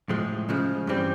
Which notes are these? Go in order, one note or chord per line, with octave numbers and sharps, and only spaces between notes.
A2 F3 G#3
C#3 F3 G#3
G2 E3 G3 C4